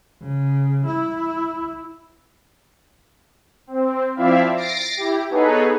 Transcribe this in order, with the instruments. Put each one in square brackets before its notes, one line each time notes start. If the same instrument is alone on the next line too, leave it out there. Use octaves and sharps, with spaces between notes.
[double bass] C#3
E4
[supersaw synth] C4
F3 C4 E4 D5 E5 F5
A6 A#6 C7 D7
E4 G4
B3 D#4 G#4 A4 B4 C#5